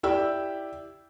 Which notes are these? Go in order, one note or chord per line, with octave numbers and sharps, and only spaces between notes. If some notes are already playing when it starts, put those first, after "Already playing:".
E4 G4 D5 G5 E6